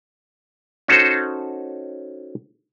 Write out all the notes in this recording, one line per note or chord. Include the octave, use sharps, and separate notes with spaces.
C#4 D#4 F#4 A4 C5